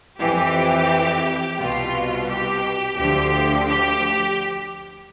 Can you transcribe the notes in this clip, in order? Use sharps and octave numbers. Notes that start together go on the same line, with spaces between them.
F2 E3 G4
C2 B2 F4
G4
D2 D3 F3 G4
G4